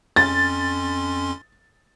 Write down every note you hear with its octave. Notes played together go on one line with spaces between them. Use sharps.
F2 C#4 C6 A6